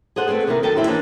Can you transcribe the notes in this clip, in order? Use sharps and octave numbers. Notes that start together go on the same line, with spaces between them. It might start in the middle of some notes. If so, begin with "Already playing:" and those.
G#4 A4 C5 F#5
A3 B3 C4 G#4
C3 D#3 A#3 E4 A#4
F#2 D#3 A4 G5 A5
D2 E4 G4 C5
E3 A#3 C#4 D4